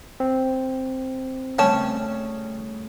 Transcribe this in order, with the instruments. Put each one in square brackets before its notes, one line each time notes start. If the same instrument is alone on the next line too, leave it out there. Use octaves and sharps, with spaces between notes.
[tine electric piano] C4
[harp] C#3 G3 A3 [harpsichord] C#4 [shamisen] G5 A5